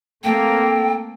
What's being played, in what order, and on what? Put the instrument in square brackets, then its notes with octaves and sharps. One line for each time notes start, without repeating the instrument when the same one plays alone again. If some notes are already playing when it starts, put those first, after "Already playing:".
[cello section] A3 A#3 C4 [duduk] A4 [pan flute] G5